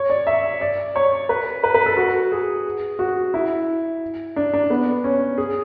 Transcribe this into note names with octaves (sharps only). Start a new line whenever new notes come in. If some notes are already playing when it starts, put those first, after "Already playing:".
Already playing: C#5
D5
E5
D5
C#5
B4
B4
B4
A4
F#4
G#4
F#4
E4
D4
D4
B3
C#4
G#4